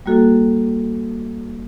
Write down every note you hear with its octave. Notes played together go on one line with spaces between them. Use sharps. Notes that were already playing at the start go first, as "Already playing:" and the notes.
G3 A#3 F#4 A4